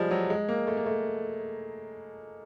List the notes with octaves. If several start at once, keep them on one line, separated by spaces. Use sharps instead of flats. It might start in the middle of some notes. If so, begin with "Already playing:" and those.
Already playing: F3 G3 G#3
F#3
G#3
A#3
A3
A#3
A3